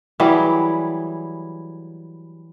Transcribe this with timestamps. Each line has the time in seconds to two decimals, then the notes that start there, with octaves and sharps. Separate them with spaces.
0.20 E3 F#3 G3 G#4